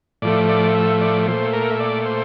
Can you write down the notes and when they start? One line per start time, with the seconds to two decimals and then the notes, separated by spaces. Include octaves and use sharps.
0.22 A2 F3 A3 D5
0.49 D5
0.75 E5
1.01 D5
1.28 A#2 A3 C5
1.53 A#4
1.71 E5
1.80 D5
2.06 C5